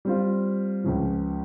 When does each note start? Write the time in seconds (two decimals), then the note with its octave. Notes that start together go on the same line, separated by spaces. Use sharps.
0.05 G3 C4 F4
0.84 C#2 C#3 F3